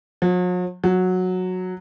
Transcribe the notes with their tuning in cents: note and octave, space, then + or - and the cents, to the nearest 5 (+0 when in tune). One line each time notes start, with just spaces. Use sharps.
F#3 -45
F#3 -10